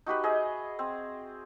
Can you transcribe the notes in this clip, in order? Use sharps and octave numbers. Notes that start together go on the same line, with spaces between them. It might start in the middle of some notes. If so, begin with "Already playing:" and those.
D#4 F#4 G4 B4
G#4 D#5 E5
C4